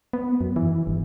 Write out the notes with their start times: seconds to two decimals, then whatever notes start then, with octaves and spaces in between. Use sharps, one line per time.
0.13 B3
0.41 F#2
0.56 E3
0.87 G1